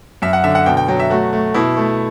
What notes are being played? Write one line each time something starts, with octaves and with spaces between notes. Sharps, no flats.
F#2 E5
F#5
D3 E5
F#5
B2 G5
G5
F#3 G5
E5
A3 F#4
A3
B2 E4
A3